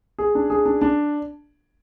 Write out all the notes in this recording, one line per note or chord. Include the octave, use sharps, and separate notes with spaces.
G#4
D4
G#4
D4
D4